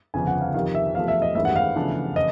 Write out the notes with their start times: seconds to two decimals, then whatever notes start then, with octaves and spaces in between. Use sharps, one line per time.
0.14 G1 F2 C#3 G#5
0.27 F#5
0.41 F5
0.54 F2 C3 D#3 F5
0.75 E5
0.95 E2 C3 F3 A3 F5
1.08 E5
1.22 D#5
1.35 A1 G2 D#3 G#3 C#4 E5
1.45 F#5
1.56 F5
1.76 E2 C#3 F3 A3 D4
2.16 D#5